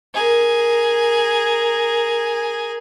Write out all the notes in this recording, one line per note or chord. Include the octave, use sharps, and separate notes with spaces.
G#4 A#4